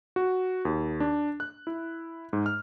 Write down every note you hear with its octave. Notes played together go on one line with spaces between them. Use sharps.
F#4
D#2
D4
F#6
E4
G#2
F6